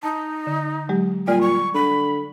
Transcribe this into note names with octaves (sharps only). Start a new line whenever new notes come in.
D#4 A5
D3
F#3 G#3 G4
A#2 G3 D5 G#5 F6
C#6
D3 B5